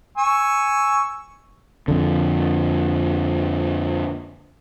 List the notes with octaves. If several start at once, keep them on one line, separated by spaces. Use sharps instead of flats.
G#5 C#6 E6
F2 D3